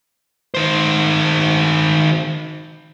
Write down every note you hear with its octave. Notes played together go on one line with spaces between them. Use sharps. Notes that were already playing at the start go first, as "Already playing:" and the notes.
D#3 C5